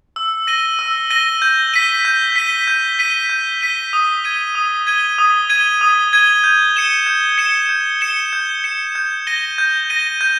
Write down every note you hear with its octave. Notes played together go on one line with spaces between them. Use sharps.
E6
A#6 D#7 G7
E6
A#6 D#7 G7
G6
B6 D#7 G7
G6
B6 D#7 G7
G6
B6 D#7 G7
G6
B6 D#7 G7
D#6
G#6 D#7 G7
D#6
G#6 D#7 G7
D#6
G#6 D#7 G7
D#6
G#6 D#7 G7
G6
C#7 E7 G7
G6
C#7 E7 G7
G6
C#7 E7 G7
G6
C#7 E7 G7
G6
A#6 D#7 G7
G6
A#6 D#7 G7
G6